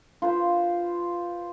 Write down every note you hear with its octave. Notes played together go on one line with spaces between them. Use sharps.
F4 B4 C5